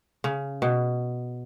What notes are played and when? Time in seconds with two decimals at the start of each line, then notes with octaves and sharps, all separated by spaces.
0.24 C#3
0.62 B2